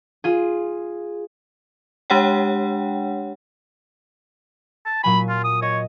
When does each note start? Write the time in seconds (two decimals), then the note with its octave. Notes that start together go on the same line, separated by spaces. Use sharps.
0.24 F4 G#4
2.10 G#3 D4 G4 C#5 F#5 G5
4.86 A5
5.04 A#2 F#3 G#5 B5
5.29 F4
5.44 D#6
5.62 C#5 D#5